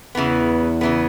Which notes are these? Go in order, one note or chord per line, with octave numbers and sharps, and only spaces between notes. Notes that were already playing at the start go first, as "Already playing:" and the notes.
E2 C#3 E3 B3
C#3 E3 B3